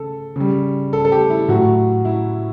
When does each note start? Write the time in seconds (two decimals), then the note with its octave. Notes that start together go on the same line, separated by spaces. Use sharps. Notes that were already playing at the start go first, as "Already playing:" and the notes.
Already playing: C#3 A4
0.36 C#3 G3
0.93 A4
1.05 A4
1.12 G4
1.30 E4
1.48 A2 F#3 F#4
2.05 E4